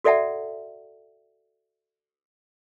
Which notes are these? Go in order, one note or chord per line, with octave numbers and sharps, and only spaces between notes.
F#4 A4 D5 E5 F#5 A5